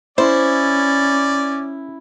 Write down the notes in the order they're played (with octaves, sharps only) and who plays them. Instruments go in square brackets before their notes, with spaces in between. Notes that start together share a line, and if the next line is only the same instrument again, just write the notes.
[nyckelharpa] C#4 [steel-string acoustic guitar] E4 [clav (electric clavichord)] C5 [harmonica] D5